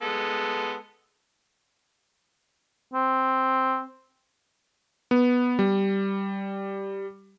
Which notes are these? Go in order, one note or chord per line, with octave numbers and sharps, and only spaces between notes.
G#3 B3 A4
C4
B3
G3